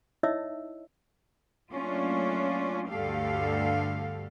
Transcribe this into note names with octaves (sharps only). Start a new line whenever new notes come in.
D#4 E4 C#5 D#5 E5 E6
F#3 A3 A#3 C#4 D4 F4
D2 G2 D3 G4 A4 F5